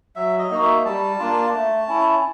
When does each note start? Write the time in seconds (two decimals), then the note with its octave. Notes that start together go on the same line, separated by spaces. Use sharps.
0.16 F#3 E5
0.38 D#5
0.51 A#3 D#4 F#4
0.62 E5
0.85 G3 A5
1.19 A#3 D4 F4
1.53 A3
1.88 C#4 E4